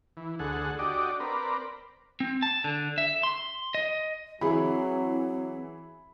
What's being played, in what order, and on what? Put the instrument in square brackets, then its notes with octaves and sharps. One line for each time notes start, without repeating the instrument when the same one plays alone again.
[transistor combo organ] E3
D2 G#4 A4 F#5
D4 F#4 G4 D5 D#5
C4 A#4 B4 D5
[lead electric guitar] C4
A5
D3
E5
C6
D#5
[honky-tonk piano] E3 E4 G#4 [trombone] F#3 [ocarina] C4 [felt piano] E5 B5